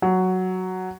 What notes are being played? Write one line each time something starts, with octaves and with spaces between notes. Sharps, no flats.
F#3